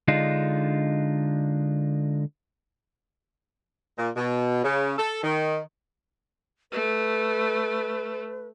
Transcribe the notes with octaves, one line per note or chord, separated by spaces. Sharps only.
D3 G#3 D4 D#4 F4
A#2
B2
C#3
A4
D#3
A3 B4